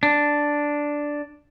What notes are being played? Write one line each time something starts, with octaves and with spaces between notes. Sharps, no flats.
D4